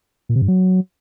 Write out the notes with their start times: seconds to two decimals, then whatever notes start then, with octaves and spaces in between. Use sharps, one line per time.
0.29 A#2
0.36 C3
0.42 G2
0.48 F#3